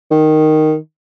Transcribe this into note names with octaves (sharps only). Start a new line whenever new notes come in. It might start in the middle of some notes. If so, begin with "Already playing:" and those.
D#3